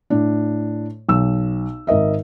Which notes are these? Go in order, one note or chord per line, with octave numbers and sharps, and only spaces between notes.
A2 D4
B1 E6
G#1 A#4 D#5 E5